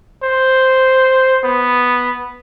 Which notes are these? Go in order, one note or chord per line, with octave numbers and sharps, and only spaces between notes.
C5
B3